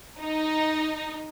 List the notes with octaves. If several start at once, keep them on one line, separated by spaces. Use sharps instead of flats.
D#4